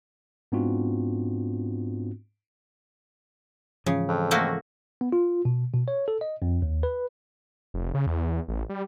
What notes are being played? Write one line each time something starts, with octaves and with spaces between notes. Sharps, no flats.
G#2 B3 C4 D4 F4 F#4
G#2 C#3 E3 F3
F2
A3 A#3 F#4
B3
F4
B2
B2
C#5
A4
D#5
F2
D#2
B4
F1
C#3
E2
A1
G3